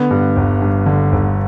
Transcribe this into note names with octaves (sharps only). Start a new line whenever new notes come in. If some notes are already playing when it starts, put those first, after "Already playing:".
Already playing: D3 B3
G2
G1
G2
D3
G1